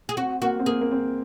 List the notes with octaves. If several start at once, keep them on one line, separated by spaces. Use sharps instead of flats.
G#4
C4 F#4
A#3 F#4
C4
A#3 G#4
A#3
C4